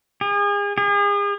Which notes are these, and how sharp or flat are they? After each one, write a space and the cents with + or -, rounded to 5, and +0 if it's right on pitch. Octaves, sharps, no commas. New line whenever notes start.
G#4 -35
G#4 -40